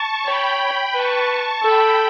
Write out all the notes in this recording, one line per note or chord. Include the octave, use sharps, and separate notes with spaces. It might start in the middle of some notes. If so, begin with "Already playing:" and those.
Already playing: A5 C#6
C#5 G5 B5
G5 B5
B4 A5 C#6
A4 G5 B5